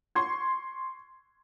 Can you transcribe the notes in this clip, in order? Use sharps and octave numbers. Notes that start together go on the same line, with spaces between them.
C6 C#6 G#6